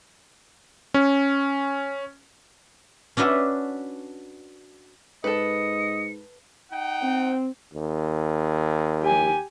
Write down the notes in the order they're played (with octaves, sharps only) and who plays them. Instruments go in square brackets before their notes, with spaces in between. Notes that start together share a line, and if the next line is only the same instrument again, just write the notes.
[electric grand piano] C#4
[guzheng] C#4 D4 F#4 B4 E5
[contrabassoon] G#2 [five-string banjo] A4 B4 [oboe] D#5 [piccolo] C#7
[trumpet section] D#4 F#5 G5
[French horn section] C4
[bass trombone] D#2
[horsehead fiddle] G4 G#5